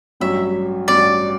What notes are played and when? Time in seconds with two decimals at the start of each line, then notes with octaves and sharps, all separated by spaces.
0.20 A1 G2 F#3 C#4 E5
0.88 A1 G2 F#3 C#4 D5